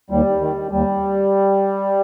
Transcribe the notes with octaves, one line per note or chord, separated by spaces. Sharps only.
D#2 G3
D#3
D#2 G3